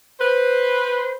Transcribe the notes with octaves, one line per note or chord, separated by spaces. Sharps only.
B4 C5